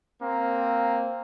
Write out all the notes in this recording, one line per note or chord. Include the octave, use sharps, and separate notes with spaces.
A#3 C4